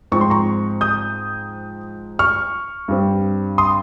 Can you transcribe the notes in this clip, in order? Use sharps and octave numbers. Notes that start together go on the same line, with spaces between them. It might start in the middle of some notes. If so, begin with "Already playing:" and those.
G#2 F3 C4 C#6
C6
A#5 C#6
D#6 G6
C#6 F6
G2 G3 C4
C6 D#6